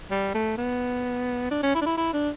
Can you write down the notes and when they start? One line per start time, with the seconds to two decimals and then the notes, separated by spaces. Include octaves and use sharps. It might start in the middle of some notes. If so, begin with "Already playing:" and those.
0.11 G3
0.34 A3
0.58 B3
1.51 D4
1.63 C#4
1.75 E4
1.81 D4
1.86 E4
1.97 E4
2.13 D4